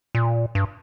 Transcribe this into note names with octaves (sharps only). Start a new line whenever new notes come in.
A#2
G2